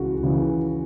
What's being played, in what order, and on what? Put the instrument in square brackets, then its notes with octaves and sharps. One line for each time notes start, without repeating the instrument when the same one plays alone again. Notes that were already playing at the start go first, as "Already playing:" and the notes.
Already playing: [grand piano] C#2 C#3 E3 F#4
C#3 E3